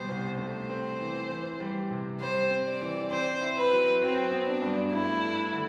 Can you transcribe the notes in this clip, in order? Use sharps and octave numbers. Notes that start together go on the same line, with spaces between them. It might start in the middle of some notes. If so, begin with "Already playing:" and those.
Already playing: D2 B2 G3 C5
C2
A3 C5
C4
E3
E3
G3
C3
G3 C5
C4
D5
E3
C4 C5
E4
B4
F#3
F#3 C4
B3
D4
G2
A3 E4
D4
D3